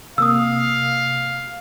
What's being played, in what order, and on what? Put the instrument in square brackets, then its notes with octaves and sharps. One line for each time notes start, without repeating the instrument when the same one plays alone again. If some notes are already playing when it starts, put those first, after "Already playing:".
[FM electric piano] C3 A#3 [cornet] F5 [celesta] D#6 E6